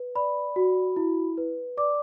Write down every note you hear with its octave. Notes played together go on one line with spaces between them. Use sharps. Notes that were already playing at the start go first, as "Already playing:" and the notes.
Already playing: B4
D5 B5
F#4
E4
B4
D5 D6